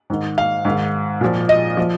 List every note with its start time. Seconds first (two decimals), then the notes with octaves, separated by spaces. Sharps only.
0.10 G#2 D#3
0.38 F5
0.65 G#2 D#3
1.21 A#2 F3
1.49 D#5
1.77 F3